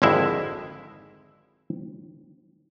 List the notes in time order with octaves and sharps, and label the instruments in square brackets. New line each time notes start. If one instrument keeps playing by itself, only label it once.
[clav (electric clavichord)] G#1 F2 D3 G#3 E4 E5